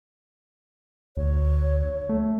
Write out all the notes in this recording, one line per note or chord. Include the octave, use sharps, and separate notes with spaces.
D2 C#5
A3